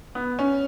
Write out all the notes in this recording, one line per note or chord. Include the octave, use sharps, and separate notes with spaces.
B3
C#4